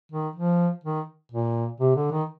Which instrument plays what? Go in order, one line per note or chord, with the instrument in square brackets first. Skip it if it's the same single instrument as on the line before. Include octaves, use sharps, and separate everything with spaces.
[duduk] D#3
F3
D#3
A#2
C3
D3
D#3